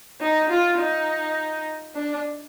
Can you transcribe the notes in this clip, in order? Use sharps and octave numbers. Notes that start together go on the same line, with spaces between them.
D#4
F4
D#4
D4